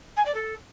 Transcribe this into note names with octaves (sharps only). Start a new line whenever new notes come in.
G#5
D5
A4